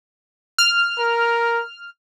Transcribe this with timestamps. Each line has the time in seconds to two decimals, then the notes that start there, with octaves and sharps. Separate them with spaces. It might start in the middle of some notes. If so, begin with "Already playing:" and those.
0.58 F6
0.99 A#4